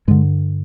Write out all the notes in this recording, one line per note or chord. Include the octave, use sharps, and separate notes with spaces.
G2 D3 G#3